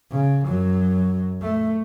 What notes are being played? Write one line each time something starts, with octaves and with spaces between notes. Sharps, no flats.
C#3
F#2 F#3
A3